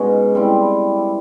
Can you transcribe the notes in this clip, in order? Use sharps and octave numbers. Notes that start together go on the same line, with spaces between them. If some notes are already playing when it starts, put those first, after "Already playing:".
Already playing: B2 G#3 C#4 D#4
G3 C4 E4